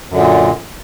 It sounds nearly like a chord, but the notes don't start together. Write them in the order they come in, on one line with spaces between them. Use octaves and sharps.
F#2 D3 A#2